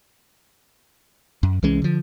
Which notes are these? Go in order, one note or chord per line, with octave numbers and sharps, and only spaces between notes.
F#2
C2 E3 G#3 C#4
D3 F3